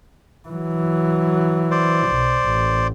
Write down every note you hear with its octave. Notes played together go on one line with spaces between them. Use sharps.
E3 F#3
C5 D5
B1
A1